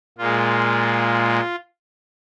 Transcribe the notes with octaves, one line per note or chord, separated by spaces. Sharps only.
A#2 G#3 F4